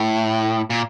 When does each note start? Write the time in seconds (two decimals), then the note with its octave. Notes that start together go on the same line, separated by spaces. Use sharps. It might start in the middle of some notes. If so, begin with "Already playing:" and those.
Already playing: A2
0.70 A#2